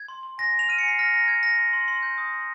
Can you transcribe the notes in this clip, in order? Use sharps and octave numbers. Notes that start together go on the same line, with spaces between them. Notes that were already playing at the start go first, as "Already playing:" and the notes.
Already playing: G#6
C6
C6
G#5 A#6
G#5
F7
F6 D#7
G#5 C#7
C7
F6 A#6
A#5 A#6
F6 G#6
F6 A#6
C6
C6
C6
G6
D#6
C6